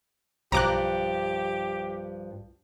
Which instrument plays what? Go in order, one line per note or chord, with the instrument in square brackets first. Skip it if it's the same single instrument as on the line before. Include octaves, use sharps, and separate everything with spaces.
[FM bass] B1 [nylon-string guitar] G2 F3 [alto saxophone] G4 [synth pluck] A#5 D6 F#6